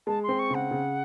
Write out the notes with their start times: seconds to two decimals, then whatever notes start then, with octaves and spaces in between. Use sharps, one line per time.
0.07 G#3 A5
0.23 C6
0.29 C4
0.39 C#6
0.50 C#3 F#5
0.71 C#3